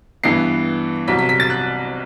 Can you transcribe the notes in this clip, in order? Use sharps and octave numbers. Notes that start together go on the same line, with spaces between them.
G2 E3 B3 C7
C2 C3 F#3 B6
B6
B6
A6
F#6